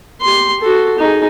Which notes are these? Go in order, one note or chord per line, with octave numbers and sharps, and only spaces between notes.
G4 C6
F#4 A4
D#4 G#4